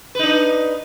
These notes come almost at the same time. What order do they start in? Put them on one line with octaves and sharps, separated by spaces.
B4 D#4 D4